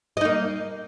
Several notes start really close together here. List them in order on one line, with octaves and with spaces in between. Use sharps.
D#5 D#4 A#3